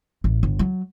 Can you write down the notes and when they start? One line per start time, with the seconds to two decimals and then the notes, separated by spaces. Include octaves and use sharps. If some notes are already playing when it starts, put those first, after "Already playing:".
0.24 A1
0.43 G1
0.59 F#3